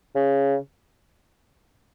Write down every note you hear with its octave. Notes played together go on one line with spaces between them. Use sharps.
C#3